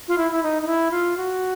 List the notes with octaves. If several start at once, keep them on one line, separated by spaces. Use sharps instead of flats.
F4
E4
E4
D#4
D#4
E4
F4
F#4